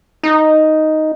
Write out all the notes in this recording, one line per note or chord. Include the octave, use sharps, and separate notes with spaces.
D#4